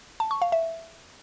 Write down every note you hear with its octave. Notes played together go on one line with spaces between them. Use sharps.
A5
C#6
F5
E5